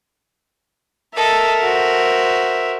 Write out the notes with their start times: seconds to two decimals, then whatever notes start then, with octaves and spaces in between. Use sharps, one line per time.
1.16 A4 A#4 D#5 E5
1.63 F#4 C5